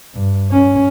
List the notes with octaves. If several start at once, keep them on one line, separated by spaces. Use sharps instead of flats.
G2
C#4